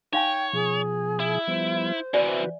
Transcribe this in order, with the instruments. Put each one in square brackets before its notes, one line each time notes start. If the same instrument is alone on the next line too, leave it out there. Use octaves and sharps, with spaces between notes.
[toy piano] D#4 F5 G#5 [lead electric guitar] C#5 [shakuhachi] G5
[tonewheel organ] B2 F3 [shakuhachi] G#4
[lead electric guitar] E4
[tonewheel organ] F3 G3 B3 [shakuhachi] C5
[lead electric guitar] C3 E3 [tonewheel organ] F#4 B4 [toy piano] D5 E5 G#5